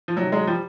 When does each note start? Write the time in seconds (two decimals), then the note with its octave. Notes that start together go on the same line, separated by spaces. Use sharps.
0.08 F3
0.17 C3 D#3 F#3
0.32 F#3 G#3
0.47 F3 G3